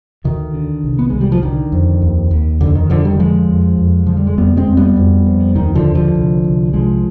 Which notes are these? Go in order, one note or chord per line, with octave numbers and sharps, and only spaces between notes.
D2 D#3
D3
C2
B3
C2 G#3
G3
F3
D3 D#3
F2
D#2
D#2
F2 D3
D#3
F2 D3 F3
D#3 G3
D3 F3 G#3
F2
F2
D3 F3
G3
G#3
F2 G3 B3
G#3 C4
F2
G3 B3
F2
F2
D#2 D#3
D3 F3
D#2
D3 F3
C2
C2
C2 F3 G#3